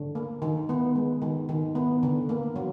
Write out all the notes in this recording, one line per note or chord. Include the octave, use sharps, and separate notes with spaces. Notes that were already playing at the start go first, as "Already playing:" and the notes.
Already playing: D3
A#3
D#3
B3
G#3
D#3
D#3
B3
D3
A#3
F#3